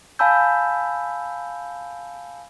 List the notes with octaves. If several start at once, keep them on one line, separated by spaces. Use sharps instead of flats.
F5 G#5 A5 B5 E6 G6